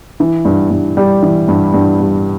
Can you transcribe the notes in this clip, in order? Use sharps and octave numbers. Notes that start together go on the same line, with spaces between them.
E3
G2
G2
G3
E3
G2
G2
G3